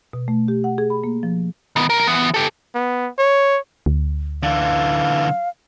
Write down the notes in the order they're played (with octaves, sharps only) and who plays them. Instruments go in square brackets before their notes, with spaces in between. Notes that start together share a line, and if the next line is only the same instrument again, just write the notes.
[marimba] B2
A3
G4
F#5
G#4
B5
A#3
F3
[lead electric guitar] D#3 B3
B1 A#4
E3 B3
G4 A4
[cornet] B3
C#5
[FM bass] D2
[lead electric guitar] D3 E3 [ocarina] F5